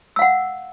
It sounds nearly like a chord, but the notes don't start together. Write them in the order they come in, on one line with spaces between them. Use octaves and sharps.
E6 F5 F#5